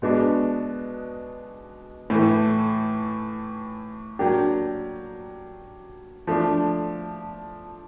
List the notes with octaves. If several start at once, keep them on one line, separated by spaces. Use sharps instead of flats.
B2 G#3 B3 D4 F#4
A2 E3 A3
F#3 A#3 D4 G4
F3 A3 D4